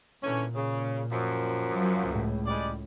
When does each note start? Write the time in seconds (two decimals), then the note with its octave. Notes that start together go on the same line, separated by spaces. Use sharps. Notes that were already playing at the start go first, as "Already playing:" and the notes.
0.23 A#2 D3 E3 C#4
0.55 C#3
1.11 F#2 F3
1.74 F#3
2.05 C#2 A2
2.46 G3 G#3 D5